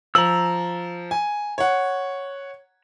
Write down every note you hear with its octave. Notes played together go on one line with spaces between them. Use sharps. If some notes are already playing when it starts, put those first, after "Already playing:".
F3 A#5 E6 F#7
G#5
C#5 F#5